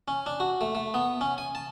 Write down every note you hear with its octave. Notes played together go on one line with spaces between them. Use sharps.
C#4
D4
F#4
A3
A3
B3
C#4
G#5
A5